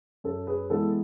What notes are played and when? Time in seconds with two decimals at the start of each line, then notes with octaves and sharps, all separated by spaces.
0.24 F#2 A4
0.47 G#4 B4
0.70 E3 G#3 B3 A4